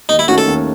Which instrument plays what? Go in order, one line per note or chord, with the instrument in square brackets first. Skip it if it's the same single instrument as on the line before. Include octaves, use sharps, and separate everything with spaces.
[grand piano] D#2 [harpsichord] D#4
[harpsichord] E4
[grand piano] D#3 A3 C#4 [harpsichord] F#4
[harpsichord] A4
[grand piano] D#2